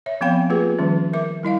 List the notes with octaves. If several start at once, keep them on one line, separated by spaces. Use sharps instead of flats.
C#5 E5
F3 B3 C4 F5 G5 B5
A3 A#3 F4 G4 G#4 B4
D#3 F3 G3 C#4
A#4 E5 D6
G3 E4 D#5 F5